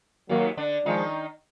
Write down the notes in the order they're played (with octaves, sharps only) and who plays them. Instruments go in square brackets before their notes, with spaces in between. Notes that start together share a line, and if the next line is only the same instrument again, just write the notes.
[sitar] D#2 D#3 [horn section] F#3 A#3
[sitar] D3 D4
[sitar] D#3 D#4 [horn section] F3 G#3